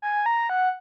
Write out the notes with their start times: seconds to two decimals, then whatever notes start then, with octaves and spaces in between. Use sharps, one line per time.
0.02 G#5
0.26 A#5
0.49 F#5